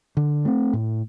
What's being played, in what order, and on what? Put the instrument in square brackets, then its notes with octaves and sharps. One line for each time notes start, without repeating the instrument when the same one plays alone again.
[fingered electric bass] D3
A3 C4
A2